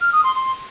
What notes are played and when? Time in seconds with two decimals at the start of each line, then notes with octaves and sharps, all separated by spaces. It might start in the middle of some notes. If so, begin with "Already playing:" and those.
0.01 F6
0.12 D#6
0.24 C6
0.35 C6